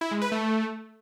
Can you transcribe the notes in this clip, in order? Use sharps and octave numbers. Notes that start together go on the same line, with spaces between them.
E4
G#3
B4
A3